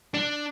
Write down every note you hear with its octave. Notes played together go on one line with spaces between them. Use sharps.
D4